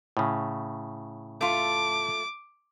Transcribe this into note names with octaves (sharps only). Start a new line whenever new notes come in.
A2 C#3
A3 F4 D6